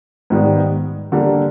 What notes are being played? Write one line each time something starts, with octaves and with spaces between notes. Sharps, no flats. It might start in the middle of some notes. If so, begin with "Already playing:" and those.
G#2 D#3 G3 B3
D3 G3 A#3